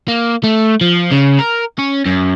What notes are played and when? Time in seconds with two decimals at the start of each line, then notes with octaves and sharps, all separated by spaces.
0.08 A#3
0.44 A3
0.81 F3
1.12 C#3
1.39 A#4
1.78 C#4
2.06 F#2